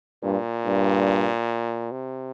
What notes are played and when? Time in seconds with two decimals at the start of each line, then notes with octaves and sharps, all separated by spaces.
0.24 G2 A#2
0.66 G2
1.92 C3